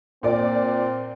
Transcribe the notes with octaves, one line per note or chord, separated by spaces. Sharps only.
A#2 C4 D5